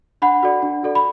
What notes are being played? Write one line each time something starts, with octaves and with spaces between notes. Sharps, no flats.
D4 F#5 B5
F#4 A4 D5
D4
F#4 A4 D5
B5